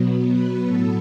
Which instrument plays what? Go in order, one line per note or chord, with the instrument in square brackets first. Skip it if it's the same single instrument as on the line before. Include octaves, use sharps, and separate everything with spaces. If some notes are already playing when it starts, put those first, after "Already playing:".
Already playing: [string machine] B2 F#3 B3
B4
A2 F#3 B3 A4